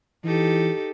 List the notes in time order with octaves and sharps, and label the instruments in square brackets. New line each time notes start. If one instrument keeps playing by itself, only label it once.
[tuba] E3 [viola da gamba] D#4 G4 A4